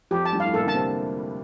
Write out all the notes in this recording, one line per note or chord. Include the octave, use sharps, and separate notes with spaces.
F2 F3 G4
A5
G2 G3
A2 A3 F5
A#2 A#3 A4
D3 D4 A5
C3 C4